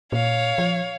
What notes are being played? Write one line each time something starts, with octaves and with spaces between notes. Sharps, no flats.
A#2 C#5 F5
F3